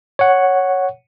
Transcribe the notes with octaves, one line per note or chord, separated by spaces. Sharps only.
C#5 F#5